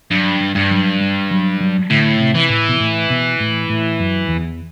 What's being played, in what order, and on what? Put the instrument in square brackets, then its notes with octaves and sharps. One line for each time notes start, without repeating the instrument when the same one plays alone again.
[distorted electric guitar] G2 [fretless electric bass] F#3
[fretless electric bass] G3
[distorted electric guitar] G2
[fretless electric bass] F#3
G3
F#3
F#3
[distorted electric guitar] A2 [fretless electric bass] D3
[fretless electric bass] C3
[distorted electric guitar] E3
[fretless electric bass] A2
B2
A2
B2
A2
A2
F#2
E2